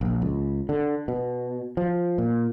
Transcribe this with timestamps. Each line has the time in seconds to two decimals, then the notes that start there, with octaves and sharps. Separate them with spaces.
0.01 A#1
0.22 C#2
0.69 D3
1.08 B2
1.77 F3
2.18 A#2